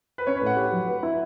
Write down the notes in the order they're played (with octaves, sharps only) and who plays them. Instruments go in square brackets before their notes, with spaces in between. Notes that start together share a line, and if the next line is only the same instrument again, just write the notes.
[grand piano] B4
[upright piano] C#4 [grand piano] C#5
[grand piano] B4
[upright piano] A2
[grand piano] F#5
[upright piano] G4
F#3
B4
E4